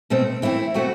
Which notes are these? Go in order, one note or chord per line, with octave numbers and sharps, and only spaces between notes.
B2 A3 C4
E3 A3 C4 E4
B2 A3 C4 F#4